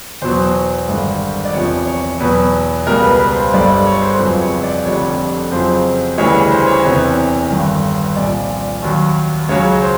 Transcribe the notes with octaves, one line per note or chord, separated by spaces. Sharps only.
E2 B2 F#3 C5
G#1 G2 D3
D5
E2 C3 F3 C#5
C#5
E2 B2 F#3 B4
C#2 B2 G3 A#4
B4
B4
C5
G1 G2 D3 G3 D5
D5
C#5
C5
F2 C#3 F#3 B4
C#5
D5
F1 F2 D3 G3 C#5
F2 C#3 F#3 C5
D2 C#3 E3 G3 C#5
C#5
C5
C#5
E2 C3 E3 C#5
G1 G2 D#3
C2 A#2 F3 D5
D#2 D#3 F#3
C#2 C#3 F#3 C#5
C5